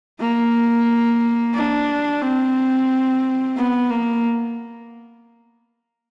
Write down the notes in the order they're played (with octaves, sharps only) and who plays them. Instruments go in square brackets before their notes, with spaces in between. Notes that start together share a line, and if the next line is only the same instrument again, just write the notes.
[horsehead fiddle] A#3
D4
C4
B3
A#3